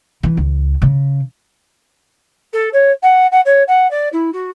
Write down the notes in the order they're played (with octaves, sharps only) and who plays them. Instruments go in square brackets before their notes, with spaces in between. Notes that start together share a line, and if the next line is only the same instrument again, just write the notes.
[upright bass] E3
C#2
C#3
[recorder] A4
C#5
F#5
F#5
C#5
F#5
D5
E4
F#4